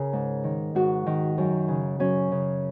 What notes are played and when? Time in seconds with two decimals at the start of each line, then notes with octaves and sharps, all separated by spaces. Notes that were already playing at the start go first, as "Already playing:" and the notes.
Already playing: C#3 G#4 A#4
0.13 G#2
0.44 D#3
0.75 G#2 F#4
1.06 D#3
1.38 F#2
1.68 C#3
2.00 F#2 C#4
2.32 C#3